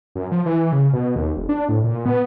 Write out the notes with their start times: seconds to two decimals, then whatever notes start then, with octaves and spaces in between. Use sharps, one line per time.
0.15 F#2
0.32 F3
0.46 E3
0.59 E3
0.72 C#3
0.93 B2
1.16 D#2
1.37 F1
1.49 D4
1.69 A2
1.84 A#2
2.06 B3